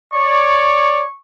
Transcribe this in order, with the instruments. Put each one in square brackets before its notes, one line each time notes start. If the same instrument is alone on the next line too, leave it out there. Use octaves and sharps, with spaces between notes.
[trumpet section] C#5 D5 [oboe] C#6